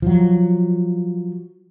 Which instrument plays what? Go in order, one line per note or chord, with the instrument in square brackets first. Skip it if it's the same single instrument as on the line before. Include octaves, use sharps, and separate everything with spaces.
[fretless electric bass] F3 F#3